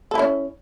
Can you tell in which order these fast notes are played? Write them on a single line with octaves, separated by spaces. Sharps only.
A4 E4 C#4